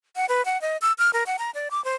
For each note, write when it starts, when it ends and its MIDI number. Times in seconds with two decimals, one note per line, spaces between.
0.16 0.26 78
0.29 0.45 71
0.45 0.60 78
0.61 0.77 75
0.82 0.93 88
0.98 1.11 89
1.13 1.24 70
1.26 1.37 78
1.39 1.51 82
1.55 1.69 74
1.71 1.83 86
1.85 1.95 72